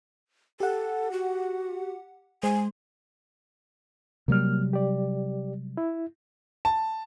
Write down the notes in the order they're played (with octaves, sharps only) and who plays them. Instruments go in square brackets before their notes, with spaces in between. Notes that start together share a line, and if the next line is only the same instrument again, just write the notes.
[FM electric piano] G4 F#5 [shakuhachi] A4
[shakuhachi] F#4
[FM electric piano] G#3 C5 [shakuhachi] G#5
[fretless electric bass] C3 F#3 G3 [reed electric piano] A#3 F6
[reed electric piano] G4 D5
E4
[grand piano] A5